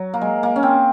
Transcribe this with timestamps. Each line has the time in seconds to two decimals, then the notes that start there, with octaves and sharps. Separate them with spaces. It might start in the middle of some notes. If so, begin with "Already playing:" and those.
Already playing: F#3
0.14 A#3
0.21 G#3
0.43 A#3
0.56 C#4
0.63 C4